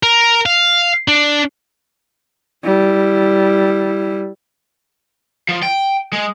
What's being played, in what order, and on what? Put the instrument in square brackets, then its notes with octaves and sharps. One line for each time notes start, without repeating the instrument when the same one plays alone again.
[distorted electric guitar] A#4
F5
D4
[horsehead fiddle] G3 E4
[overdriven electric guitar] F3
G5
G#3